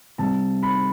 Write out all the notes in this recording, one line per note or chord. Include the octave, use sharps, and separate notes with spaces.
C3 G3 A5
B5